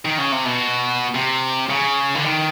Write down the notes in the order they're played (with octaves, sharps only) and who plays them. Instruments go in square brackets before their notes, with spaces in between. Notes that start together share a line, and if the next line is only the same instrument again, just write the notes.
[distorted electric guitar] D#3
C#3
C3
B2
C3
C#3
D3
D#3